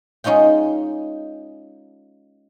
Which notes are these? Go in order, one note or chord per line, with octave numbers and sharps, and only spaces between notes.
G#3 C#4 D#4 F4 G5